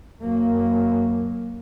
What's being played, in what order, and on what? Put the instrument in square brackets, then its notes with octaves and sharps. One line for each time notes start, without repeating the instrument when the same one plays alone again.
[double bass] F#2 A#3